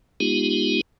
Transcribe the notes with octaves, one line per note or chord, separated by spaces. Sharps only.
G#3 B3 D#4 F4 G4